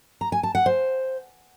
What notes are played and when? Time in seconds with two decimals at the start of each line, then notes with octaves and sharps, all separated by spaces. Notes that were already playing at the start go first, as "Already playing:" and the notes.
0.21 A#5
0.32 G#5
0.43 A5
0.55 F#5
0.66 C5